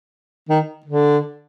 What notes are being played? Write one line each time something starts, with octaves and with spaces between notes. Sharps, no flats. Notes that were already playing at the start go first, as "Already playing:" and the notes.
D#3
D3